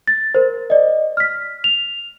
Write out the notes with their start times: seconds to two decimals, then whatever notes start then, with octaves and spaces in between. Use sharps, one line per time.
0.07 A6
0.35 A#4 C5
0.70 D5 D#5
1.17 F6 B6
1.64 F7